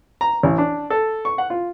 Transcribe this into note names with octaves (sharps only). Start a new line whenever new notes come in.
A#5
A1
D4
A4
C#6
F#5
F4